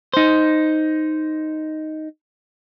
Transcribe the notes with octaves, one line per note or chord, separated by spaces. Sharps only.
D#4 C5